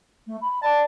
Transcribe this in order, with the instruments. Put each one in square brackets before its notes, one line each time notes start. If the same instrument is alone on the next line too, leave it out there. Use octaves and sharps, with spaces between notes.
[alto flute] A3
B5
[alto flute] D5 [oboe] A5